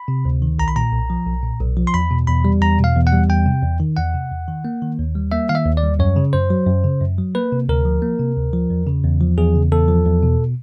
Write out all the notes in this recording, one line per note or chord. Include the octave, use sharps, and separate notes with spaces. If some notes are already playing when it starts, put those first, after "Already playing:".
Already playing: B5
C3
D2
D#3
B1 A#5
B5
A#2 A#5
B1
F3
B1
A#2
B1
F3
C6
E2 B5
B2
E2 B5
G3
E2 A#5
B2
F5
E2
F#5
G3
E2 G5
C3
E2
D#3
E2 F#5
C3
E2
D#3
A#3
D#3
D#2
G3
A#3 E5
D#3 F5
E5
D#2
D5
G3
F#2 C#5
C#3
F#2 C5
F#3
F#2
C#3
F#2
F#3
A#3 B4
C3
D2 A#4
F3
A#3
C3
D2
F3
E2
C#3
E2
F3
E2 G#4
C#3
E2 A4
F3
E2
B2